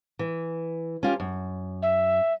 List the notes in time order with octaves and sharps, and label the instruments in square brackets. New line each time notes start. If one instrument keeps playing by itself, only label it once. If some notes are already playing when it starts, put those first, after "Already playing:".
[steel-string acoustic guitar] E3
C#4 F4 G4
F#2
[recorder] E5